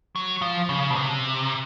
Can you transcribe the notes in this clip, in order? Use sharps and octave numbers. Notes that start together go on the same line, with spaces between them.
F#3
F3
C#3
B2
C3